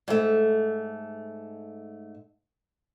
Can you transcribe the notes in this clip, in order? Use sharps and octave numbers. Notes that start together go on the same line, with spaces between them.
G#2 A3